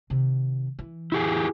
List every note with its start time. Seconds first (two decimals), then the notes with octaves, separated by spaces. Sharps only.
0.10 C3 D#3
0.79 E3
1.12 E4 G4 G#4